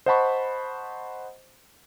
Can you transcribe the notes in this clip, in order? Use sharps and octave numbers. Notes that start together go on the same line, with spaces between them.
C5 D#5 F#5 A5 B5 C#6